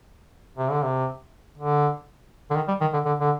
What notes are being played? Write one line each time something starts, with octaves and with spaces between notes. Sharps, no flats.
C3
D3
C3
D3
D3
D#3
G3
D#3
D3
D3
D3